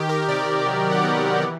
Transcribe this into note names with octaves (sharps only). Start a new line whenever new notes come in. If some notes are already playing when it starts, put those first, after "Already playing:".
Already playing: D#3 G4
A#4
C3 D5
F#3
F#5
B3
E3